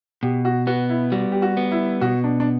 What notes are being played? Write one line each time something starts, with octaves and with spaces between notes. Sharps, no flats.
B2 G4
F#4
B3 F#4
E4
G3 F#4
G4
F#4
B3
E4
B2 F#4
D4
D4